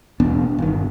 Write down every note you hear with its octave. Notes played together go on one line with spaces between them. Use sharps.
E1 B3 D4
G1 D#3